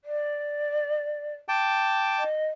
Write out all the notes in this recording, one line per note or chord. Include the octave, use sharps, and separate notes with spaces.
D5
G5 A5 D6
D#5